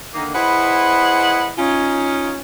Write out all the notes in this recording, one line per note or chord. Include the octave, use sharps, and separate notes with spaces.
D3 D#3 A#3 D#4
E4 G#4 B4 C5 D#5 F#5
C#4 D#4 F4